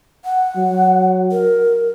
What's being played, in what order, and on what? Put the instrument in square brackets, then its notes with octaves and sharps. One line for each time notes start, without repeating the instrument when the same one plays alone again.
[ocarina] F#5
[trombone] F#3
[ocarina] A#4